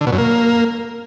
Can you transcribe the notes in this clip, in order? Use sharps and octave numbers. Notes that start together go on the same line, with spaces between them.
D3
B2
F#2
A#3